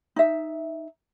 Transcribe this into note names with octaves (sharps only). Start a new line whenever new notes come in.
D#4 E5